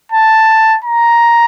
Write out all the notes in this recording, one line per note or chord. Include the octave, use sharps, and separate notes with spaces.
A5
A#5